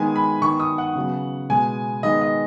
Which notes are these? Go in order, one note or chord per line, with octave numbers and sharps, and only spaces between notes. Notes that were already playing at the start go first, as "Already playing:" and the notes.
Already playing: D#3 G#3 B3 G#5
B5
D#3 B3 C#6
D#6
F#5
C#3 F#3 B3
B2 G#3 B3 G#5
D#3 G#3 B3 D#5
D#5